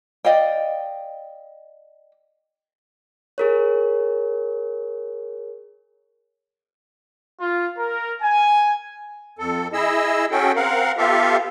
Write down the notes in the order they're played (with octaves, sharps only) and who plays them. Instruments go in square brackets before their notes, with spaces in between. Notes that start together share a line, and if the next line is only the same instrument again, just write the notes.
[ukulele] D5 D#5 F5 G5
[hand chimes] G#4 A#4 C#5
[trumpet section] F4
A#4
G#5
[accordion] F2 A4
E4 G#4 D#5 E6
C#4 F#4 G#4 A4 G5
C4 A#4 F5 F#5
B3 F4 G4 A4 E5 F5